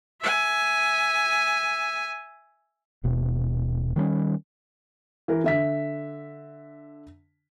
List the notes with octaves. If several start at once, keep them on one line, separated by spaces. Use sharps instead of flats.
E5 G#5
D#1 B2
D#3 G3 B3 C#4
E3 A#4
D3 E5 B6